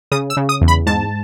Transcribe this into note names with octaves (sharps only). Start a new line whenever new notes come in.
C#3 D#6
E6
C#3
D#6
E2
B5
G#2 A5